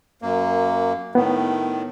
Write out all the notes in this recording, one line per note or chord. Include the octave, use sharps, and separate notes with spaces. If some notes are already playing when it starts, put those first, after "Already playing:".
F#2 A#3
A2 D#3 B3